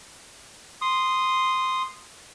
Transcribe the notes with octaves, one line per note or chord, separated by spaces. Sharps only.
C6 D#6